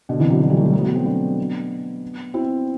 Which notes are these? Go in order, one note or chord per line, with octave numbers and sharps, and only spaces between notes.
B2 D3
C3 E3
D3 F#3
D3 F#3
E3 G3
F#3 A3
E3 G3
F#3 A3
B3
F#3 A3
A3 C4
B3 D4
C4 E4